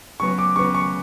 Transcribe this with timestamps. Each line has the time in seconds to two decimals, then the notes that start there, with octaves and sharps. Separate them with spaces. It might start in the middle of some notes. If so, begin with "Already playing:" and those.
0.19 C#3 F#3 B3 C#6
0.38 D6
0.56 C#3 F#3 B3 C#6
0.75 C#6